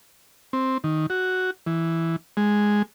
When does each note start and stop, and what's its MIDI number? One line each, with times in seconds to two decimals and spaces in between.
0.53 0.78 60
0.84 1.06 51
1.10 1.51 66
1.67 2.16 52
2.37 2.82 56